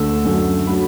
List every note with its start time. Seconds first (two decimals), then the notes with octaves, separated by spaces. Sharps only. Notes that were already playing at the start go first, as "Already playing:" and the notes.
Already playing: D2 D3 A3 E6
0.25 F#2 D3 A3
0.67 F#3 A3 B5